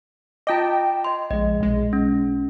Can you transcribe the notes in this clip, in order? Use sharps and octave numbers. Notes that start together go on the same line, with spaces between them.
F4 D#5 G5 A5 D6
D#5 C6
A#1 G#3 D#5
B1 G#3
C#4